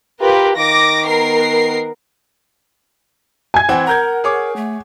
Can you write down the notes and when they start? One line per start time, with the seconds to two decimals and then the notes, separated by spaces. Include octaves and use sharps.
0.21 F4 G4 A#4 B4
0.57 D#3 D6 A#6
1.04 B3 A#4 C7
3.54 G#5 G#6
3.69 E3 C4 F#5
3.87 A#4 A#5 G6 G#6
4.24 G#4 C#5 D6
4.56 A3